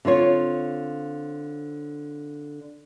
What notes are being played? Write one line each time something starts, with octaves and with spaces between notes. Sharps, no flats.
D3 C4 F4 C#5